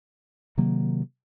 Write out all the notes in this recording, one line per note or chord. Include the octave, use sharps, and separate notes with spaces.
C3 D#3 F#3 A#3